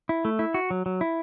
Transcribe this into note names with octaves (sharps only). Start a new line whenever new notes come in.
E4
A3
E4
F#4
F#3
F#3
E4